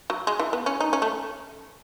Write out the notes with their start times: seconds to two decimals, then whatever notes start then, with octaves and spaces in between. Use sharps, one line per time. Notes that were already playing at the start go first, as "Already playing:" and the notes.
0.10 F#3
0.27 G#3
0.39 E3
0.53 B3
0.66 C#4
0.80 D#4
0.93 C#4
1.02 A3